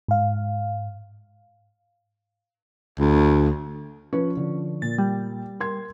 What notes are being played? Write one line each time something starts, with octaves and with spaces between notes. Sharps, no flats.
G#2 F5
D2
F3 C#4 B4
D3 F3
A#2 A6
G3
A#4 C6 G#6